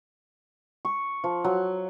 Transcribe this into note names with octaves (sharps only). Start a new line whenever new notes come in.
C#6
F3
F#3